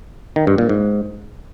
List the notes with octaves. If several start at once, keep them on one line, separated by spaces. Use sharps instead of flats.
D#3
G2
A#2
G#2